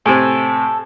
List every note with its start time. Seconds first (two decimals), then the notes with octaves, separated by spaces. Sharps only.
0.06 A2 C3 C4 A4 G#5